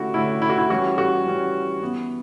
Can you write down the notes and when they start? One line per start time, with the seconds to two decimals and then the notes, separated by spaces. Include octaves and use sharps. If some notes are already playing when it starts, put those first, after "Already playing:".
Already playing: D3 A3 C#4 E4 F#4 G4
0.14 D3 A3 C#4 E4
0.42 E4
0.50 F#4
0.58 E4
0.70 E3 G3 C#4 F#4
0.98 F#4
1.26 E3 G3 C#4
1.81 E3 B3